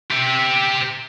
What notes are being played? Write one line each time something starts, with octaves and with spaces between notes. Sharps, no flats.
G4 E5